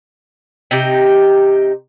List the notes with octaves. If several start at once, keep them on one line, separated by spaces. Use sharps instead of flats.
C3 D#4 G4